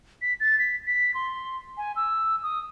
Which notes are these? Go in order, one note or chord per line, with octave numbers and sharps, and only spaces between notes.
B6
A6
B6
B6
C6
G#5
E6
D#6